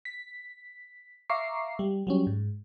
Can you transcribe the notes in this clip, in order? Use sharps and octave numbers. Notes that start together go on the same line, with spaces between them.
B6
E5 F5 A#5 C#6 D6 C7
G3
F#3 G3 C#4
G#2